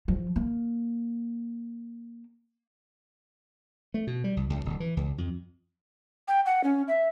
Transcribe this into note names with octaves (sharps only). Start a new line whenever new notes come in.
F3
A#3
A3
B2
G3
C2
C#2
D1
E3
C#2
F2
G5
F#5
C#4
E5